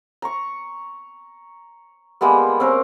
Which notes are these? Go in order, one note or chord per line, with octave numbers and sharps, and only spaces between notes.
A#5 C#6
G3 G#3 A#3 B3
C4 C#4 A#4